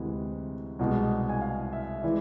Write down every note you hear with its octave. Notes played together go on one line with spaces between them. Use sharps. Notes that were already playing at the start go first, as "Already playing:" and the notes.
Already playing: D2 C3 E3 G#3
C2 B2 G#3
G#5
F5
E5
E3 G#3 D5